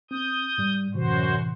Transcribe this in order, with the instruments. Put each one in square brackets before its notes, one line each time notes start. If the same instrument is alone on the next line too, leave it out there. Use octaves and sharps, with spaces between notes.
[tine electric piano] C4 [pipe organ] D#6 G6
[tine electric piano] G#2 G3
[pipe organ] F#2 F#4 C5 [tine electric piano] A2 C3 E3